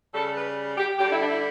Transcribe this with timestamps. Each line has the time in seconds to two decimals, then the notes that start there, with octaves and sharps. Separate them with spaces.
0.14 C#3 G3 A4
0.35 B4
0.77 G4
0.98 D3 G3 G4
1.09 E4
1.19 D4
1.30 E4